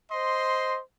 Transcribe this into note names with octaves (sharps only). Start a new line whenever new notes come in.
C5 D#5 C6